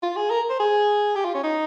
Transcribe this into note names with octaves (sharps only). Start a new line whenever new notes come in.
F4
G#4
A#4
C5
G#4
G4
F4
C#4
D#4